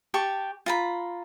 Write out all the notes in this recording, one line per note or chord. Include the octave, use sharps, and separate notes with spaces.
G4 A5 C#6
F4 A#5 B5